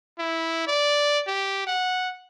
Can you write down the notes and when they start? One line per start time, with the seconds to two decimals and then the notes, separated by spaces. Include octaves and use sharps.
0.19 E4
0.67 D5
1.27 G4
1.67 F#5